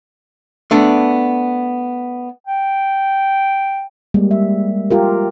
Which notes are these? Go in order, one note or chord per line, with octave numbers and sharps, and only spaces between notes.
A3 B3 D4
G5
G3 G#3 A#3
E5
F4 G4 A#4